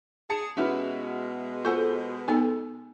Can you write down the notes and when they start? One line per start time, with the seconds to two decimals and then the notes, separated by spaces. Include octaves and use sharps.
0.30 G#4 A5 C#7
0.57 B2 G#3 C#4 E4 F#4 G4 B4
1.65 F4 A4 C5 F#5 G#5 G6
2.28 B3 D#4 A4 G#5